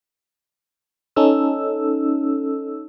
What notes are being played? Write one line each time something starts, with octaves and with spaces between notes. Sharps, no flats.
C#4 D#4 A4 E6